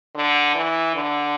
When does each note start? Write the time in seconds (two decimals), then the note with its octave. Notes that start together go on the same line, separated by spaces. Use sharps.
0.15 D3
0.55 E3
0.95 D3